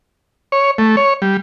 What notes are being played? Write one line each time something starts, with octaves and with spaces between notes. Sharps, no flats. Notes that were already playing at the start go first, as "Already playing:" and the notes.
C#5
A3
C#5
G3